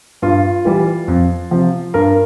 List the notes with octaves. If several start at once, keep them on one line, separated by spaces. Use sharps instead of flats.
G2 F4
E3 G3
F2
C3 F3
G2 A#4